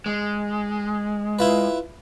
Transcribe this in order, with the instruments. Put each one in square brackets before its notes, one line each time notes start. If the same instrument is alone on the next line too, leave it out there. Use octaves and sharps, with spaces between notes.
[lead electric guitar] G#3
[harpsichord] E4 F4 B4